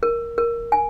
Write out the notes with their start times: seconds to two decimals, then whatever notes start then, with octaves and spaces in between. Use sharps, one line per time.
0.03 A#4
0.38 A#4
0.72 G#5